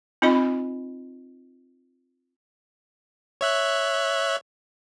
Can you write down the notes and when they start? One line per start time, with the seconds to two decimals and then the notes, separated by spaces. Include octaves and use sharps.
0.22 C4 D#4 F4 D#5 B5
3.41 C#5 E5 F#6